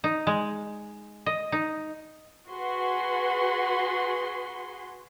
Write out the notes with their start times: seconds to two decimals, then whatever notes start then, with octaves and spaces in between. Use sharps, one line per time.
0.04 D#4
0.27 G#3
1.26 D#5
1.52 D#4
2.48 F#4 G#4 B4 C6